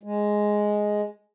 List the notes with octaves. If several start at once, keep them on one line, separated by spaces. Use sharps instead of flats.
G#3